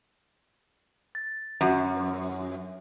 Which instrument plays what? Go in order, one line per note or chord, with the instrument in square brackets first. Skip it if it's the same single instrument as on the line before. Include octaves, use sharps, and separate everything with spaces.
[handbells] A6
[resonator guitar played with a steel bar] F#2 [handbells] F#4 F#5 A#5